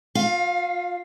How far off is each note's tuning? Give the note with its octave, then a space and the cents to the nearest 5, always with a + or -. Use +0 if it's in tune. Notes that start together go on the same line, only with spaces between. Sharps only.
F4 +30 F5 +0